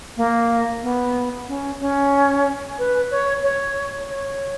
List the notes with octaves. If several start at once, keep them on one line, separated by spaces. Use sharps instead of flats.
A#3
B3
C#4
C#4
B4
C#5
C#5
C#5